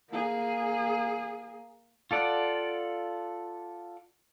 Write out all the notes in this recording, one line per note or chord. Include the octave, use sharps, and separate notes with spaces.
A#3 G#4
F4 A4 D5 F#5